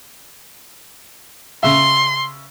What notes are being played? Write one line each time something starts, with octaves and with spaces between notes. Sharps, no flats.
C#3 E5 C6